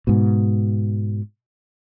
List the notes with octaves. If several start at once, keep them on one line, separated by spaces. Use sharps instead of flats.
G#2 B2